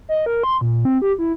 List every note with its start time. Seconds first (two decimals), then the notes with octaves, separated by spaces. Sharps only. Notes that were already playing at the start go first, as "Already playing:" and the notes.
0.09 D#5
0.26 A#4
0.43 C6
0.61 A#2
0.85 C4
1.02 G4
1.19 E4